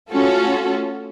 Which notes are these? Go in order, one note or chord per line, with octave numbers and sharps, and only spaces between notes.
A3 C#4 F4 F#4 A4